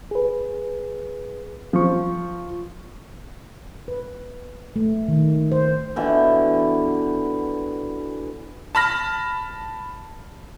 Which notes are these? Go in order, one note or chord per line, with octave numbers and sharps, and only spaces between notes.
G#4 B4
F3 F4 C#6
B4
A3
D#3
C5
B2 D3 E3 G5
A5 B5 F6 A#6